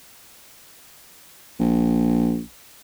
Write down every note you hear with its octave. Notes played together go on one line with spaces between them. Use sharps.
A#1